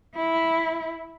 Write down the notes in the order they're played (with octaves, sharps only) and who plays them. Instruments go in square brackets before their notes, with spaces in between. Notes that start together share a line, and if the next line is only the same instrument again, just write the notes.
[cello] E4